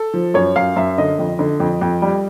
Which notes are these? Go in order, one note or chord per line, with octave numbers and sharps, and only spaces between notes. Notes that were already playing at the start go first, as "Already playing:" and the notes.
Already playing: A4
F3
F#2 C#5
F#2 F5
F#2 E5
D3 D#5
F2
D3
F2
F2
G3